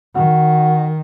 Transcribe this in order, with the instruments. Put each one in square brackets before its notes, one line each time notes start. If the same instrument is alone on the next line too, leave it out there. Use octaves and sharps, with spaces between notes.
[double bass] D#3 [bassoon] F#4